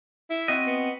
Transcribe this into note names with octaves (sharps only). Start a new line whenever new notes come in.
E4
C4 F#4 D#5
B3